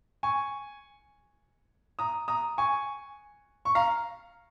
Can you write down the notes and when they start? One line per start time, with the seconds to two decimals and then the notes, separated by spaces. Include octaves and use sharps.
0.23 G#5 C#6
1.99 A#5 D#6
2.28 A#5 D#6
2.58 G#5 C#6
3.65 C#6
3.75 F5 A#5